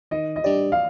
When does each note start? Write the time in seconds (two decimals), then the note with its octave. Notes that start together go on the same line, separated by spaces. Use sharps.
0.11 D#3 D#5
0.36 D#5
0.44 G3 D4 G4 D5
0.72 F5